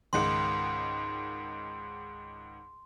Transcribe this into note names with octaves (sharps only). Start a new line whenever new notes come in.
C#2 G#2 D#3 C6